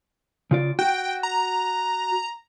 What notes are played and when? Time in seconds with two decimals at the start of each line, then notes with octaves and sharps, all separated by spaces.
0.51 C#3 F4 D5
0.79 F#4 G5
1.23 A#5